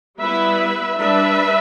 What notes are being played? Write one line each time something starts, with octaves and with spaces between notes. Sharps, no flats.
G3 B3 E4 B4 E5
G3 D4 B4 E5